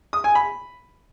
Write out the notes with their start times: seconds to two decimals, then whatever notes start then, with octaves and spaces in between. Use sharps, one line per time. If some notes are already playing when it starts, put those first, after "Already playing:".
0.13 D#6
0.24 G#5
0.35 B5